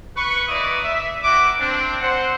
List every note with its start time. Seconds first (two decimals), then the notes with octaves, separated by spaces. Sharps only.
0.16 B4 C#6
0.48 A#3 E4 B4 D5 D#5 D#6
0.84 E5
1.24 A#3 E4 F#4 B4 G5 D6
1.59 C4 D4
2.01 C4 C5 F#5